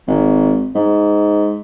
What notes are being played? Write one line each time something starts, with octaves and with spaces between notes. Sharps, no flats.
G#1
G#2